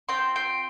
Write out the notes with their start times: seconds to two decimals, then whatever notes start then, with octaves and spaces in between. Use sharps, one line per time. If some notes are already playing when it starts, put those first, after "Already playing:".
0.09 C4 F4 G5 C6
0.36 G5 C6